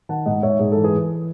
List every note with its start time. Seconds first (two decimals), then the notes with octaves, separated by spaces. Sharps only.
0.09 D#3 F#5 A5
0.26 G#2 D#5 F#5
0.43 G#2 C#5 E5
0.59 G#2 G#4
0.72 E3 A4
0.84 G#4 B4
0.93 E3